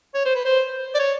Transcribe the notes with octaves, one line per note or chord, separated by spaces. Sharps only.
C#5
C5
B4
C5
D5
C#5